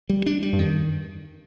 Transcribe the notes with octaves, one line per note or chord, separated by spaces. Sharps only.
G3
D4
G3
G2
F2 D#3